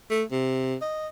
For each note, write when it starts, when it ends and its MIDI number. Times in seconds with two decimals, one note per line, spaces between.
0.11 0.23 57
0.31 0.75 48
0.81 1.07 75